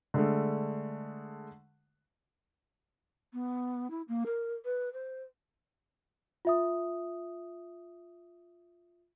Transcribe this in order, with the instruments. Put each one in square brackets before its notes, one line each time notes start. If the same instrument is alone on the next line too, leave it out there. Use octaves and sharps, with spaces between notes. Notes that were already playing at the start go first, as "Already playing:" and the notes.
[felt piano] D3 G#3 A3
[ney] B3
E4
A#3
A#4
B4
C5
[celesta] F4 E5 D#6